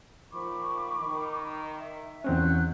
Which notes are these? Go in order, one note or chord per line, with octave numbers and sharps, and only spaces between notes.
A#2 D#3 F3 B5 C#6 D6
D#3
E5
E2 F#3 G#3 C4 C#4 C5 F#6